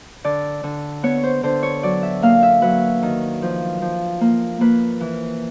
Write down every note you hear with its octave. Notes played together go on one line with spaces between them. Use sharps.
D3 D5
D3
B3 C#5
C5
D3 C5
C#5
F#3 D5
E5
A#3 F5
E5
F#3 B4
D#3
F3
F3
A#3
A#3 B4
E3